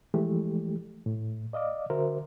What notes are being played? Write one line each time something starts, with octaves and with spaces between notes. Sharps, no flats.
E3 F3 G#3 A3 G4
A2
D5 D#5 F5 D6
D3 F#4 A#4 C5 E5